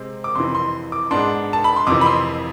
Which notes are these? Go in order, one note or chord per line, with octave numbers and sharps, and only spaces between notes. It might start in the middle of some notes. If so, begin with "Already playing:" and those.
Already playing: C3 G#3 C4
D6
F2 C3 E3 C6
C6
D6
G#2 G#3 B3 D4 C6
A5
B5
C6
F2 C3 E3 D6
B5
C6